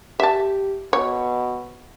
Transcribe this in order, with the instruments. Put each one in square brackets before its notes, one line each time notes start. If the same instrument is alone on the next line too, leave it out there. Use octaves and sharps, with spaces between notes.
[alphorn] G4 [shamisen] E5 A5
[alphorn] B2 [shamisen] C#5